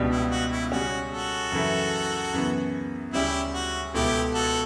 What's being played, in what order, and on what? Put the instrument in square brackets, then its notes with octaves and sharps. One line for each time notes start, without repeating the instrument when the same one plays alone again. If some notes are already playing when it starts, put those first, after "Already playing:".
Already playing: [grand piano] C#2 B2 G3 D4 G4
[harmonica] E4
F#4
E4
[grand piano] C#3 G3 C#4 [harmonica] F#4
[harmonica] F#4 A4
[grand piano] F#2 C#3 E3 A3 E4
F#2 C#3 E3 B3
[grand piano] D2 C#3 G3 C#4 [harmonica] E4 G4
[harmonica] F#4
[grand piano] C#2 B2 A3 [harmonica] E4 G4
[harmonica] F#4 A4